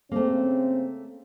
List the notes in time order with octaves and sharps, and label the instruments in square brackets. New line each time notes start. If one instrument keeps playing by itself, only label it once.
[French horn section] C#3 C4 [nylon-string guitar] A3 A#3